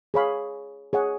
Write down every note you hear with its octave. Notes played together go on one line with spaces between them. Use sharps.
G#4 C#5 F5 B5
G#4 C#5 F#5